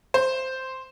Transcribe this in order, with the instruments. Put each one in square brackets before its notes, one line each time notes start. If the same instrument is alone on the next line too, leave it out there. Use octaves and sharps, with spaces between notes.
[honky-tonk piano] C5